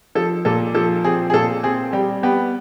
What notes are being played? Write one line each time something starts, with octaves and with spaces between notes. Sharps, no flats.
F3 A4
A#2 A4
F3 A4
C4 G#4
G#4
A#2 A4
C4 G#4
G3 G4
B3 G4